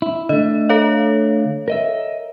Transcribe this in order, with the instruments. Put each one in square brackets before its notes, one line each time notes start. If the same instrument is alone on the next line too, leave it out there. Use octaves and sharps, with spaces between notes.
[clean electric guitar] E4
[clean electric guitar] D3 A3 [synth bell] D#5
[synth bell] A4 C#5 F5
[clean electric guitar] A#4 D#5 E5